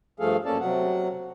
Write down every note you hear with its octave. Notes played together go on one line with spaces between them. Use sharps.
G2 F3 A3 G#4 A4 F5
F#2 A#3 C#4 A4 D5 A5
C3 F#3 F#5